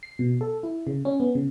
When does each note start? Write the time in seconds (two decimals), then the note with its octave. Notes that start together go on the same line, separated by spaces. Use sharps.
0.03 C7
0.19 B2
0.41 A4
0.63 E4
0.87 C#3
1.05 C#4
1.20 B3
1.35 C#3